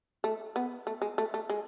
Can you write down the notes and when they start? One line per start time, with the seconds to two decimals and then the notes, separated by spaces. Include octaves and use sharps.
0.24 A3
0.56 B3
0.87 A3
1.02 G#3
1.18 A3
1.34 A3
1.50 G#3